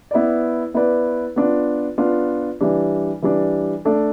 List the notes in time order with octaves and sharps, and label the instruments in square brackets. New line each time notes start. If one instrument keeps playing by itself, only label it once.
[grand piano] B3 E4 B4 D5
B3 E4 B4 D5
B3 D4 F4
B3 D4 F4
E3 G3 D4
E3 G3 D4
A3 D4 A4